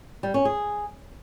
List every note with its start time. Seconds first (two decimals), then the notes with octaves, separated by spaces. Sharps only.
0.23 G3
0.34 C#4
0.45 G#4